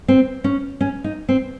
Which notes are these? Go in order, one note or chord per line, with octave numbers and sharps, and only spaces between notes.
C4
C#4
C#4
D#4
C4